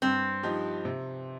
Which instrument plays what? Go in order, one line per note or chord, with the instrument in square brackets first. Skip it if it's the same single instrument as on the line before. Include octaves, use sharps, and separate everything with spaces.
[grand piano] G2 [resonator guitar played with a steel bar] C4
[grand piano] F3 D#4 G4
C3